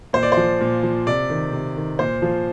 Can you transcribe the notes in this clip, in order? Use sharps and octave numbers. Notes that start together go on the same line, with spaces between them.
A#2 C5
D5
F3 C5
A#2
F3
C3 D5
D#3
C3
D#3
A#2 C5
F3